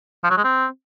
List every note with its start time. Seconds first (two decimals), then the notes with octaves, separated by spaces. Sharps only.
0.24 F3
0.30 F#3
0.37 G#3
0.44 C4